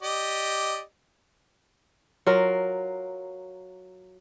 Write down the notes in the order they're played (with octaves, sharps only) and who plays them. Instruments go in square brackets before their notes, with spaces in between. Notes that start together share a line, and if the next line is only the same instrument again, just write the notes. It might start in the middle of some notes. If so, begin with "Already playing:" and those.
[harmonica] G4 D5 D#5
[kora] F#3 F4 A#4